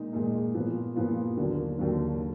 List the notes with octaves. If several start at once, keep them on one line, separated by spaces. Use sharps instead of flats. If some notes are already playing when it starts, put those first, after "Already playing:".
Already playing: A#2 G#3 D#4
A#2 G#3 D#4
A#2 F3 B3 F4
A#2 F3 B3 F4
D#2 D3 F#3 A#3 D4
D#2 D3 F#3 A#3 D4
D3